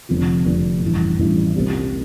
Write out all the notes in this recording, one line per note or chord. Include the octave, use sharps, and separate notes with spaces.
F1 F2 D3 F3
F1 F2 D3 F3
A1 G2 E3
A1 G2 E3
C2 A#2 G3 C4 F4